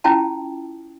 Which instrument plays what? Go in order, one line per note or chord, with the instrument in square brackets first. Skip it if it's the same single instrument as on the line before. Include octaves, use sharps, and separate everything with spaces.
[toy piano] C#4 E4 F4 G5 A5